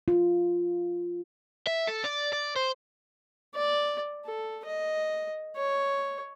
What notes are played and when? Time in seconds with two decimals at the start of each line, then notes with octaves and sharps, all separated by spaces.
0.08 F4
1.67 E5
1.88 A4
2.04 D5
2.33 D5
2.56 C5
3.55 D5
4.25 A4
4.66 D#5
5.56 C#5